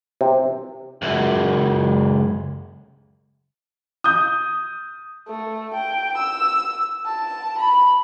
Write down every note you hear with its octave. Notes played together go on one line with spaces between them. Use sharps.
C3
C#2 F#2
D#6 G6
A3
G5
E6
A5
B5